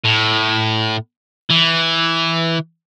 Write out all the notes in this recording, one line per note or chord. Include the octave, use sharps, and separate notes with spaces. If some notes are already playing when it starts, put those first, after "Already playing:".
A2
E3